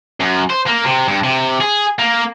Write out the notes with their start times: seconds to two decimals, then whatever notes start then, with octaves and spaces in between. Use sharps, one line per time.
0.20 F#2
0.50 C5
0.67 A#3
0.84 C3
1.08 G2
1.24 C3
1.61 G#4
1.99 A#3